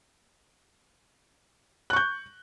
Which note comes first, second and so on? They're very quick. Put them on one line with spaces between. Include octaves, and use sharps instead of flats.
F#6 C#6 G6